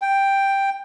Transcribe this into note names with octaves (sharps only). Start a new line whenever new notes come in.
G5